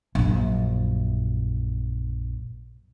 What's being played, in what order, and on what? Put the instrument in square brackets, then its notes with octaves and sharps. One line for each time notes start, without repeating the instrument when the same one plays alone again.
[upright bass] A#1 F#2